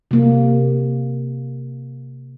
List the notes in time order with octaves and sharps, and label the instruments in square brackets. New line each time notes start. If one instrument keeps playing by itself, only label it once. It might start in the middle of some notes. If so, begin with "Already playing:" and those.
[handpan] C3 A#3